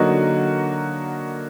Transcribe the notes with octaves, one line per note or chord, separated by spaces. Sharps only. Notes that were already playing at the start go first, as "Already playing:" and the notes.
Already playing: D3 F#3 A#3 D#4 F#4